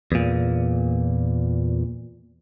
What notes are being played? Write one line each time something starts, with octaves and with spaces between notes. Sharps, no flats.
E2 A#2